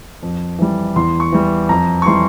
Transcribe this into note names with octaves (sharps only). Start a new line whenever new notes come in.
F2
E3 G3
E2 C6
C#6
E3 G3
F2 A#5
C#6
E3 G3 C6